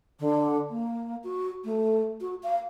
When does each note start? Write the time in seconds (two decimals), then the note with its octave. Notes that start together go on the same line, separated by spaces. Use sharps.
0.20 D3
0.70 A#3
1.24 F#4
1.64 A3
2.21 F#4
2.43 F5